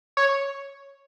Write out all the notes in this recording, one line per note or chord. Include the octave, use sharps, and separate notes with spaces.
C#5